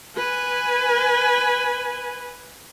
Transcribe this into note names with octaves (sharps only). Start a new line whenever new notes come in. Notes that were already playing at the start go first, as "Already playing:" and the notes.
B4 G#5